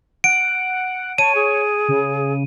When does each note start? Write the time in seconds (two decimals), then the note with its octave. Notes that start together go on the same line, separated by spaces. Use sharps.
0.24 F#5 D7
1.18 C#5 A5 D#7
1.35 G#4
1.88 C#3